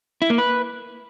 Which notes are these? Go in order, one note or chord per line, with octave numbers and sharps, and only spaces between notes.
E4
A#3
B4